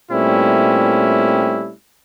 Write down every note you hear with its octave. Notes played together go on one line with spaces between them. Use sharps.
A#2 G3 A3 C4 C#4 E4